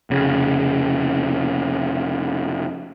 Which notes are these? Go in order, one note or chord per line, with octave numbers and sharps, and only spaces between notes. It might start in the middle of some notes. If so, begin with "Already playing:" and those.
F1 C#3